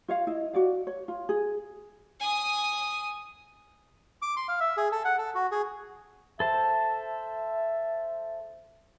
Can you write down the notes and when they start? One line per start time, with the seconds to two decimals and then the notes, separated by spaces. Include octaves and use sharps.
0.08 F4 C#5 F5
0.27 E4 D#5
0.53 F#4 D5 F5
0.87 C#5
1.08 F4
1.29 G#4
2.20 G#5 D#6
4.22 D6
4.37 C6
4.48 F5
4.60 E5
4.77 G#4
4.92 A4
5.05 F#5
5.18 A4
5.35 F#4
5.51 G#4
6.40 A4 C5 E5 A5